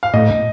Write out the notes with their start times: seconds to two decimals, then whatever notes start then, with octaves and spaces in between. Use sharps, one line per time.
0.03 F5
0.14 A2 D#5